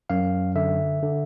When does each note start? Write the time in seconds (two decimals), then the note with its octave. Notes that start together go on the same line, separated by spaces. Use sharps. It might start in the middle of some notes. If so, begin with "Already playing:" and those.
0.10 F#2 F5
0.56 D3 E5
1.02 D3